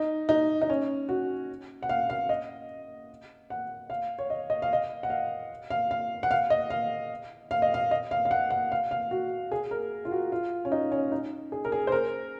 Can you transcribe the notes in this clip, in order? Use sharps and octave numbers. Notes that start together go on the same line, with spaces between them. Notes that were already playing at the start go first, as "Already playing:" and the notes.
Already playing: D#4
D#4
D#4
C#4
F#4
F#5
F5
F5
D#5
F#5
F5
C#5
D#5
D#5
F5
D#5
F#5
F5
F5
F5
F#5
F5
D#5
F5
F5
D#5
F5
D#5
F5
F5
F#5
F#5
F5
F5
F#4
G#4
A#4
F4
F#4
F4
C#4
D#4
C#4
D#4
G#4
A#4
G#4
C5
A#4